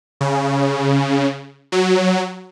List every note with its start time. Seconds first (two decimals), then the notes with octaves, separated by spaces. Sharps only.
0.21 C#3
1.72 F#3